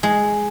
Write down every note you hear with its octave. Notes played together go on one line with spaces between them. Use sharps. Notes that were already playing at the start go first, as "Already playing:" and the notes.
G#3